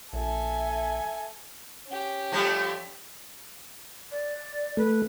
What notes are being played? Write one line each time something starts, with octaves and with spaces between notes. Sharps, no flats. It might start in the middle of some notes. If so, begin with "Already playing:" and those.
A#1 A4 E5 G#5
C#4 G4
F3 G3 A3
D5
A3 B4